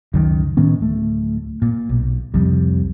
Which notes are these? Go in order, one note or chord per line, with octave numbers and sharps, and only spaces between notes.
C#2 F#2 D#3
A2 D#3 B3 C#4
D1 A3
A#2
B1
C2 F2 G3